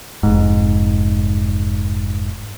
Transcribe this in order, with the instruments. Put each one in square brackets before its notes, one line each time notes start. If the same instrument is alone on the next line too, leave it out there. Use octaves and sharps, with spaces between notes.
[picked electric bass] F1 G#2